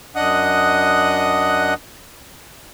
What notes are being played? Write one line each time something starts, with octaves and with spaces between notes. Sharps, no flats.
F#2 D4 D#5 F#5 D#6 F#6